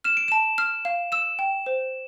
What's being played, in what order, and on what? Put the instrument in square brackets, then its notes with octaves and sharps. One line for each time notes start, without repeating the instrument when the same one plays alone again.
[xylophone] F6 [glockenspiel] E7
[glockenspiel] D7
[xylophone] A5 [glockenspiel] E7
[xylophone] F6
F5
[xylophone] E6 [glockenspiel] E7
[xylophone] G5
C5